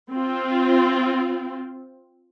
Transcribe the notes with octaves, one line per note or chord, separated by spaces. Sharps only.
C4 F4